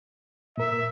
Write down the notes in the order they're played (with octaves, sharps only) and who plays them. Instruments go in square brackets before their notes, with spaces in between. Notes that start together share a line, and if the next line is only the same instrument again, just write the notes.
[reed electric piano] A#2 A#4 [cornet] E5